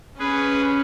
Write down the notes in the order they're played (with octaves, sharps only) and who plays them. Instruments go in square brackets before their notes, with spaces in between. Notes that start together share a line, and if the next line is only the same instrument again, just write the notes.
[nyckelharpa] C#4 [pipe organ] G#4 B4